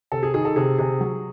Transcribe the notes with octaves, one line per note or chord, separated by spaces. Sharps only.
C3 A4
G#4
D#3 G#4
A4
C3 G#4
C3 G#4
F#3